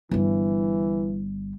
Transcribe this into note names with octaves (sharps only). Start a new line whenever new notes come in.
G1 E3 G3